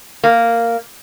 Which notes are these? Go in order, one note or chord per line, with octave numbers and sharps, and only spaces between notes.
A#3